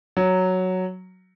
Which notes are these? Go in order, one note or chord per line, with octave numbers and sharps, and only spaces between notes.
F#3